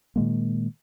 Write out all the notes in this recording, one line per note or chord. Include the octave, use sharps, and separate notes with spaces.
A#2 D#3 G#3 A#3